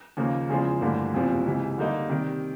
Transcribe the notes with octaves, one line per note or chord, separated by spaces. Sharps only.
D#2 C#3 F3 A#3
E2 C#3 F3 G#3
A1 G2 D3 F3 A#3
F#1 E2 C3 F3
C#2 C3 E3
D3 G3 A#3 D#4
C3 D#3 G3